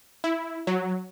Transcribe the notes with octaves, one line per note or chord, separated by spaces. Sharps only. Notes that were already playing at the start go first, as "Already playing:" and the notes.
E4
F#3